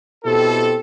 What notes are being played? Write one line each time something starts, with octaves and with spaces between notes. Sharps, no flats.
B2 C4 E4 G4 A4